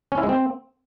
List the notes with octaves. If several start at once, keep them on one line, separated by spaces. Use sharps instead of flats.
C#4
E4
G#3
C4